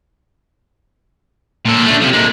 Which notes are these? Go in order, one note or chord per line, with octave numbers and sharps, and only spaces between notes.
A#2 A4
A3 D4
C3 F3
A#2 G#3